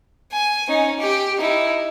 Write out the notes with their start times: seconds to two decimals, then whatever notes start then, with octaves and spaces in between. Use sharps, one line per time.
0.32 G#5
0.68 C#4 D#4
1.00 G4
1.38 D#4 E4